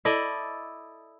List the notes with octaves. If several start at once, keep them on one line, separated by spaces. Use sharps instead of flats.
E4 A4 D5 D#5